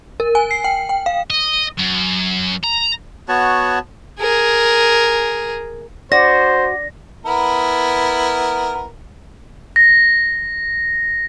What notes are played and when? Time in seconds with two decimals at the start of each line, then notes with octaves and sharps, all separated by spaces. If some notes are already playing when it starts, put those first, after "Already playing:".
0.20 A#4
0.35 G#5
0.51 C7
0.64 G5
0.89 G5
1.06 F5
1.30 D#5
1.79 F#2
2.64 A#5
3.28 B3 F#4 C#5 A5
4.20 G#4 A#4
6.12 F#4 C5 D5 A#6
7.26 B3 E4 A#4
9.76 A#6